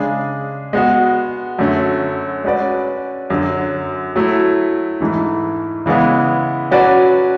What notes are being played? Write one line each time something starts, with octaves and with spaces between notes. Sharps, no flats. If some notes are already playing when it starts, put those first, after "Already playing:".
Already playing: C#3 G#3 D4 G#4
G#3 B3 F#4
F#2 D3 A3 C#4
G#3 C#4 F#4 B4 D5
F#2 D3 F#3
F#3 A3 E4
G#2 E3 A3
C#3 E3 G#3 B3 E4
F#3 C#4 F#4 B4 D5